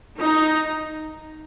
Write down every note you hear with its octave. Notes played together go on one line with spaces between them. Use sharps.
D#4